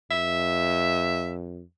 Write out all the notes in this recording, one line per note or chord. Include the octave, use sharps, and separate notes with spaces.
F2 E5